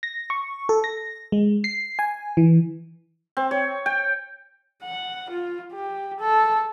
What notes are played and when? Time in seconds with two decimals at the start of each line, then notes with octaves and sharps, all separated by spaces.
0.03 A#6
0.30 C#6
0.69 A4
0.84 A#6
1.32 G#3
1.64 C7
1.99 G#5
2.37 E3
3.37 C4
3.51 C#5
3.86 G5
4.83 F#5
5.30 F4
5.73 G4
6.20 A4